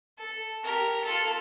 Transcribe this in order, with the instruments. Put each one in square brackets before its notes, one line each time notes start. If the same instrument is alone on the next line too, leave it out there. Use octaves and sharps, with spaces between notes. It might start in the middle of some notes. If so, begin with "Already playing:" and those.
[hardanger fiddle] A4
G4 A#4
F4 A4